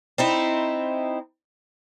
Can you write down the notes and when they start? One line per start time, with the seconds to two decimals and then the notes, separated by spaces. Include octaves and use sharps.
0.18 C4 D#4 E4